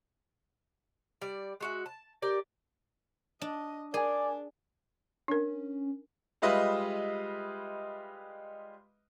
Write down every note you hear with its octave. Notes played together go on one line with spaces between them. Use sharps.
G3 D5
G#3 F#4 E5
A5
G4 A#4 D5
D4 D#5
D4 G#4 A#4 D5 G#5
C#4 D4 A#4
G3 G#3 F4 B4 D#5 E5